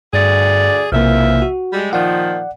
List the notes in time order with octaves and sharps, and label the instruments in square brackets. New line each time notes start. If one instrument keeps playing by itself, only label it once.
[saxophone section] D2 G#4 D5 [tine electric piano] G2
[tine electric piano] B1 C3 A#3 [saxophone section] E3 F3 E5
[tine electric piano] F#4
[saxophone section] G3 G#3
[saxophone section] A#2 D#3 F3 [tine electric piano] D5 F#5